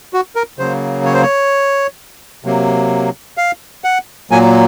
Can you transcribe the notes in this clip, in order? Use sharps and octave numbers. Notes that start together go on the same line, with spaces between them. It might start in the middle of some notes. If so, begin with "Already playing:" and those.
F#4
A#4
C#3 F#3 A#3 C5
C#5
C5
C#5
C3 F#3 A#3
F5
F#5
A#2 F#3 A#3 G#5